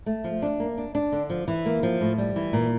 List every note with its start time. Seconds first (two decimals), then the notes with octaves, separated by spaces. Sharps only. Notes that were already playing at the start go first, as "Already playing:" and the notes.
0.06 A3
0.24 F3
0.42 D4
0.60 A#3
0.78 D4
0.95 D4
1.12 D3
1.30 F3
1.48 E3
1.66 A#3
1.83 F3
2.01 A2
2.18 G3
2.36 E3
2.53 A#2